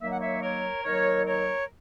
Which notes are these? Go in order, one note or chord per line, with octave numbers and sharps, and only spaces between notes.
D#3 F#3 A#3 E5
F#5
C#5 E5
A#4 C#5
D#3 F#3 A#3 A#4 C#5
A#4 C#5